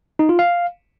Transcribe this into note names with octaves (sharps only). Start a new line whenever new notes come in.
D#4
F4
F5